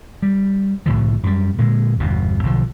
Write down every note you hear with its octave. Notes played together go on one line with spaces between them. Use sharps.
G3
C2 A2 D3 F3
F#2 G3
A#2 D3 G#3
G1 E2 G2 B2
B1 D3 F3